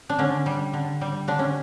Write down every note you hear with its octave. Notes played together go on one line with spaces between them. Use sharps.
D4
D3 C#4
G3
D3
G3
D3 D4
C#4